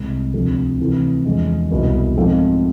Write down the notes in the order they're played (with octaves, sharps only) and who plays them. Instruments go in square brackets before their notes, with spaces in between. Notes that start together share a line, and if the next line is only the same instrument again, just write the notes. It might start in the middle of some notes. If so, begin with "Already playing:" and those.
Already playing: [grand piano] C2 C3 G#3
D2 C3 F3 A3
C3 E3 A3 E4
E2 D3 F3 G#3
C2 B2 B3
G#2 F3 A3 C4 F4